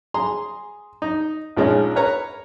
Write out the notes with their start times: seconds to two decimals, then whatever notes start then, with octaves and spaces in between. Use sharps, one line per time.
0.14 G#4 A#5 C6
1.02 D#4
1.56 A#1 F3 G#3 C#4 D#4
1.96 A#4 B4 C#5 A#5